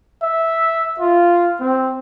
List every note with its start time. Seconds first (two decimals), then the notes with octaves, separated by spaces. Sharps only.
0.22 E5
1.00 F4
1.61 C4